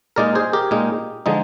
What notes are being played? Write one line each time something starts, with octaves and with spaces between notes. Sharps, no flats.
A#2 G#3 D#4 A#4 D5
G#4 C5
G4 A#4
A#2 G#3 D#4
D3 F3 G#3 D#4